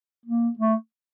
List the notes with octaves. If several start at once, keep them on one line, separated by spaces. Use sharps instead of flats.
A#3
A3